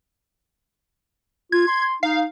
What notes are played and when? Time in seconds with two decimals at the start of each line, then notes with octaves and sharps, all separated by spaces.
1.52 F4 G#6
1.68 C6
2.03 D#4 F5